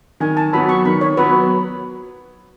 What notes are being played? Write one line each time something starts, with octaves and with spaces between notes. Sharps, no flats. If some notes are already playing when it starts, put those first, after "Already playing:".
D#3 G#5
A5
F#3 B3 B5
C#6
D#3 B5
C#5
F#3 B3 B4